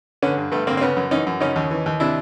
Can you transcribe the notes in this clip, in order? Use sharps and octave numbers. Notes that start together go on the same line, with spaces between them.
D3 B3 C#4
G2
G2 A3 B3
D3 A#3 C4
C4
C#3 B3 C#4
F#2
E3 C#4 D#4
F#2
C#3 C#4 D#4
D#2
E3
D#2
C3 D4 E4